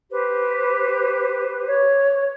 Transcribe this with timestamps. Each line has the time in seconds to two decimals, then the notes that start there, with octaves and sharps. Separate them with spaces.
0.11 G4 B4 C5
1.67 C#5